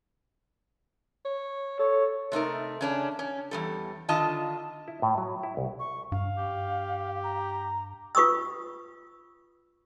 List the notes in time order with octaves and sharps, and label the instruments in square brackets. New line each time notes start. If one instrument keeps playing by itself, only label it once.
[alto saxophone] C#5
[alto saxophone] A4 [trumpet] C#5
[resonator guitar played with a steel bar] C3 A3 D#4 A#4
C#3 C#4 D4
C#4
E2 G3 A4
D3 D#3 F4 D#5 A5
[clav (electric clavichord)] E4
A2
F#3
E4
C2
[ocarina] C#6
[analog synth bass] G2 [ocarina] F5
[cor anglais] G4
[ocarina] A#5
[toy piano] F4 B4 C#6 D#6 E6